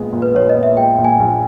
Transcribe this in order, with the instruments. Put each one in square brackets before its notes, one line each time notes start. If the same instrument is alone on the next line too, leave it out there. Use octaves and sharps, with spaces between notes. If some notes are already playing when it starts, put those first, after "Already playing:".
Already playing: [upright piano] A#1 A#2 G#3 B3
A#2
[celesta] B4
[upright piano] A#1 [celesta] C#5
[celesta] D#5
[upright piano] B3
[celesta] E5
[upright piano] G#3 [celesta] G5
[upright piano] A#2
[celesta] G#5
[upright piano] A#1